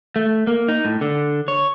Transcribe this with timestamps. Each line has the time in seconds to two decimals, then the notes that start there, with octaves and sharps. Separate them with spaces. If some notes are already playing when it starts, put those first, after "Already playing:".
0.16 A3
0.47 A#3
0.68 D#4
0.85 A2
1.01 D3
1.48 C#5